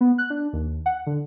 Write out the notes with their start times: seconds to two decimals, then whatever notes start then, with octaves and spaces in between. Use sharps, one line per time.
0.01 B3
0.18 F#6
0.30 D4
0.53 D#2
0.86 F#5
1.07 D3